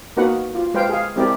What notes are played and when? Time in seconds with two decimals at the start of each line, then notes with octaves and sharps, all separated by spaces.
0.17 A#3 B3 D#4 F#4 B4 F#5
0.55 F4
0.74 G#3 B4 C5 F5 G5
0.89 G#4 F5
1.16 G#3 C4 E4 G4 A#4 D5